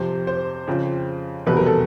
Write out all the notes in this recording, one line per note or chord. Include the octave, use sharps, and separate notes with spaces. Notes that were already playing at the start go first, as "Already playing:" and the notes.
Already playing: F2 C3 F3 C5
C5
F2 C#3 F3
F1 E2 B2 G3 B4
A#4
A4